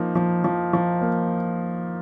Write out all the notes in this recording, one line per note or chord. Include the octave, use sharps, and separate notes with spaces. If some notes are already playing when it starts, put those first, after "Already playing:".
Already playing: F3 A#3 D#4
F3
F3
F3
A#3